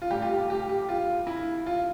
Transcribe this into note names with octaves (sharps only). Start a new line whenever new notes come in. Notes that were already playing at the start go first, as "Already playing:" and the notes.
F4
A2 G3 G4
F4
G4
G4
G4
F4
E4
F4